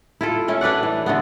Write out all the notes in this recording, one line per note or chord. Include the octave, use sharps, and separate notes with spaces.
E4 F4 A4
A3 C#4 E4
D4 B4 D5 F#5
E3
D3 A3 B3